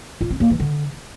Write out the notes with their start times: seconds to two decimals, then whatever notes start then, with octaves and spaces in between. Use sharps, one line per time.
0.21 F4
0.30 C4
0.40 A#3
0.50 E3
0.60 D3